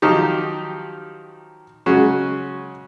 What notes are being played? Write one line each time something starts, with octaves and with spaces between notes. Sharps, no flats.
D#3 F3 F#3 D#4 G4
C#3 F#3 G#3 C#4 F#4